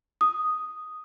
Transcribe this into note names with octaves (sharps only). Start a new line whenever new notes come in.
D#6